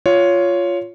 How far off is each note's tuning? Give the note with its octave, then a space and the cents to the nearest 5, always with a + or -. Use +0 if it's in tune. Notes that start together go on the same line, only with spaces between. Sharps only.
F4 +0 C#5 +10